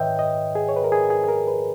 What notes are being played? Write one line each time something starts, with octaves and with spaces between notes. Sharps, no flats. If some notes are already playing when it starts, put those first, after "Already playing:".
Already playing: G#2 D#3 B4 C#5 D#5 E5 G5
D#5
G#4
C#5
B4
A#4
G#4
G#4
G#4
A#4
B4